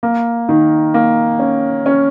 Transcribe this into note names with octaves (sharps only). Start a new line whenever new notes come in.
A#3
D#3
A#3
C#4
C#4